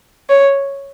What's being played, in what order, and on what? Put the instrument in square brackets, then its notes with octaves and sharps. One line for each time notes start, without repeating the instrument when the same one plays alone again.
[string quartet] C#5